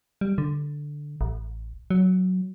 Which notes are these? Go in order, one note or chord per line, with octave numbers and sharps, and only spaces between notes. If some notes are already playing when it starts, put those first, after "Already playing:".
G3
D3
A1
F#3